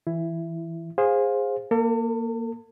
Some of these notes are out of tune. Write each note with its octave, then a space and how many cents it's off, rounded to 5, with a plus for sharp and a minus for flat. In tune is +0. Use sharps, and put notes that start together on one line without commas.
E3 +0 E4 +15
G#4 -20 C5 +10 F5 +20
A#3 +0 A4 +40